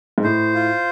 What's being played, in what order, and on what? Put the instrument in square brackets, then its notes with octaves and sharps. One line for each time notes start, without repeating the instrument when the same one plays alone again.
[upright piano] G#2
[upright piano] A2 [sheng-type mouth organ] C5
[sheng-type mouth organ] F4